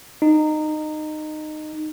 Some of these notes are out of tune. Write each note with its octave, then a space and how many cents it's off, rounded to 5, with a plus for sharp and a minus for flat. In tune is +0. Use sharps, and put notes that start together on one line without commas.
D#4 -20